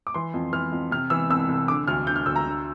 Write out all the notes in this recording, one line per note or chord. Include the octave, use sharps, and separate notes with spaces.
D6
E3 C6
F2
E3 F6
F2
C3 F6
E3 E6
C2 E6
C2
D3 D6
D2 F6
D3 G6
F6
D2 E6
A#5
D3